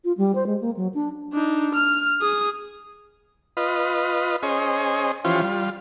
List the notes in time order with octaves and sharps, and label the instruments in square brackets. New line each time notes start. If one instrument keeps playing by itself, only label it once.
[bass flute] F4
G3
C5
G#3
A#3
F#3
D4
[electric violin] D4 D#4
F6
G#4 D#6
[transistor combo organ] F4 B4 D#5
C#4 G#4 C5 D#5
E3 F3 C#4 F4 G4 C5
G3 F4